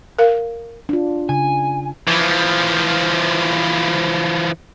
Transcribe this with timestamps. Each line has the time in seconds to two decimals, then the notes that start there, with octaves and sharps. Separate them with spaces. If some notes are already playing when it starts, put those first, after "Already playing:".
0.19 A#4 F5
0.89 D4 F4
1.29 C#3 G#5
2.08 E3 F3